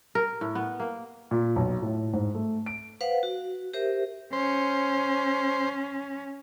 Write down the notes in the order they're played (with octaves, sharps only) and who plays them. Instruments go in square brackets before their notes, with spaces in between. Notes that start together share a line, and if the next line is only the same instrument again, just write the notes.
[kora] A#4
A2
B3
A#3
[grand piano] A#2
B1
A2
G#2
A3
D7
[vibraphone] B4 C5 F5 F#5
F#4
G4 A#4 C5 E5
[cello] C#4 [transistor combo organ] C5